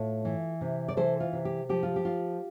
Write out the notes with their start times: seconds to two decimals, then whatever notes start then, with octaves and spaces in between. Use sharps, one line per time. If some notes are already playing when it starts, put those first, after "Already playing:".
Already playing: A2 F4 A4
0.25 E3
0.61 C3
0.88 D5
0.97 E3 A4 C5
1.20 F4
1.33 C3
1.45 G4
1.69 F3 G4
1.83 F4
1.96 G4
2.05 F4